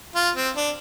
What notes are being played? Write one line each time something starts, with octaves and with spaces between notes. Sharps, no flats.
F4
C4
D4